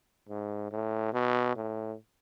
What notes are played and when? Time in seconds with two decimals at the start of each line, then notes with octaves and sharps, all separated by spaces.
0.29 G#2
0.71 A2
1.13 B2
1.56 A2